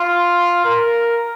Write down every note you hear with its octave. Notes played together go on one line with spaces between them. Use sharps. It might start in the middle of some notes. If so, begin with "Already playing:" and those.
Already playing: F4
A#4